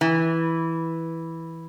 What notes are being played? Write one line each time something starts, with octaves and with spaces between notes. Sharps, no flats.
E3